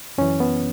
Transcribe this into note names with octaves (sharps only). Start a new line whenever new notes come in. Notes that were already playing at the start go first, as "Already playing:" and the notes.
F#2 E3 C#4
B3